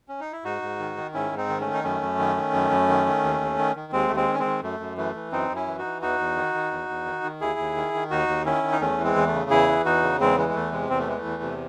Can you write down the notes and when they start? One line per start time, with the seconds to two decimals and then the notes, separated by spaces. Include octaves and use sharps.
0.08 C#4
0.20 D#4
0.32 E4
0.44 G#2 D#4 F#4
0.62 G#2
0.79 D#3
0.97 D#3
1.14 G#2 C#4 E4
1.32 G#2
1.37 C4 D#4
1.49 D#3
1.61 A3 C#4
1.66 D#3
1.74 D#4
1.84 F#2 A3 C#4
2.02 F#2
2.19 D#3
2.36 D#3
2.54 F#2
2.71 F#2
2.89 D#3
3.06 D#3
3.23 D#2
3.41 D#2
3.58 D#3
3.76 D#3
3.92 D#2 G#3 C4
4.08 D#2 A3
4.16 G#3 C4
4.28 D#3
4.34 C#4
4.39 G#3 C4
4.45 D#3
4.63 F#2 A3
4.80 F#2
4.97 E3 A3
5.15 E3
5.32 F#2 C4 D#4
5.50 F#2
5.56 C#4 E4
5.67 E3
5.79 D#4 F#4
5.84 E3
6.02 E2 D#4 F#4
6.19 E2
6.37 D#3
6.54 D#3
6.71 E2
6.89 E2
7.06 D#3
7.24 D#3
7.41 D#2 E4 G#4
7.59 D#2
7.76 D#3
7.94 D#3
8.11 D#2 D#4 F#4
8.28 D#2
8.46 D#3 C#4 E4
8.63 D#3
8.72 D#4
8.81 E2 A3 C#4
8.98 E3
9.04 G#3 C4
9.16 E2
9.27 A3
9.33 C#3
9.50 E2 E4 G#4
9.68 E3
9.85 E2 D#4 F#4
10.03 C#3
10.20 E2 G#3 C4
10.37 E3 G#3
10.49 G#3
10.55 E2 A3
10.72 C3 G#3
10.89 E2 C4
10.99 A3
11.07 E3 G#3
11.17 A3
11.25 E2
11.42 C3